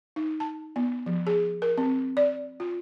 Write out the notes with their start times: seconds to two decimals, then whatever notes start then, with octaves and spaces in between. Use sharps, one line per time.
0.16 D#4
0.40 A5
0.76 B3
1.06 F3
1.27 G#4
1.62 A#4
1.78 C4
2.17 D5
2.60 F4